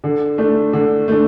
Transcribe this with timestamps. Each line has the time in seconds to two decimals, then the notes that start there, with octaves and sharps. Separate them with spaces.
0.04 D3
0.38 A3 D4
0.73 D3
1.08 A3 D4